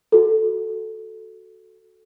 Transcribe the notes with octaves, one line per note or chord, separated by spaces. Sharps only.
F#4 A4